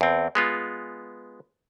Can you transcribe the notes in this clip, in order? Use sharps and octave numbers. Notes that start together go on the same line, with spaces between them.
E2 C4
G#3 B3 F4